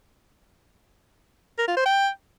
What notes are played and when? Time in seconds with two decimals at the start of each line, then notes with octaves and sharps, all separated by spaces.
1.59 A#4
1.68 F4
1.77 C5
1.86 G5